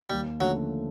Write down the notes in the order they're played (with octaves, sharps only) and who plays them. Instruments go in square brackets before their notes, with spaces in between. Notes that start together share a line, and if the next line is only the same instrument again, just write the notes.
[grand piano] D#2 [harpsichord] G3
[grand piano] D3 F3 A3 C#4 [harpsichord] F#3